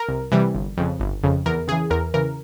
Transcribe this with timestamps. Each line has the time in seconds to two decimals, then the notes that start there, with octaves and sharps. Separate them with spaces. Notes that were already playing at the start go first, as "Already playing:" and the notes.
Already playing: A#4
0.09 C2
0.32 C3 E3 G3
0.54 G1
0.77 F2 C#3
1.00 G1
1.23 F2 C#3
1.46 E2 A#4
1.68 C#3 E3 G#4
1.90 E2 A#4
2.14 C#3 E3 A#4